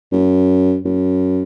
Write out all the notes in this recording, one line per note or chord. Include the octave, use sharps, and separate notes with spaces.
F#2
F#2